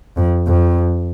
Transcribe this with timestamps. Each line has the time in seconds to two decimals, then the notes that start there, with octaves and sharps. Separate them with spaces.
0.17 F2
0.48 F2